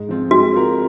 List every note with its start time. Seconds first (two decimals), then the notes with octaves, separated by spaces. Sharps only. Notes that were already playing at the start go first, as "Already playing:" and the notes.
Already playing: G#2
0.09 F3 C4 F4
0.31 G#3 F#4
0.53 C4 F4 A#4